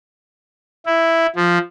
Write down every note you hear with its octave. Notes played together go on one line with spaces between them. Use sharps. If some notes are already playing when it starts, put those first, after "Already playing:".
E4
F3